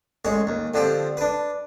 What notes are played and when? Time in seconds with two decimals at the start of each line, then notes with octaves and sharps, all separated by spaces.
0.25 A1 G#3 C#5
0.47 D#2
0.74 D3 F3 C4 G4
1.17 D4 B4